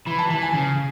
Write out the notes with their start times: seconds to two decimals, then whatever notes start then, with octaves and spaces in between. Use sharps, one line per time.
0.06 E3 B5
0.19 A5
0.30 E3 A5
0.42 G#5
0.54 C#3